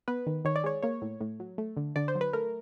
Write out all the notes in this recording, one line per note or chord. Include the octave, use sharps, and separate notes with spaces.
B3 B4
D#3
D#3 C#5
D5
G#3 C#5
A#3 C#5
A2
A2
F#3
A3
D3
D3 D5
C5
F#3
B4
A3 A#4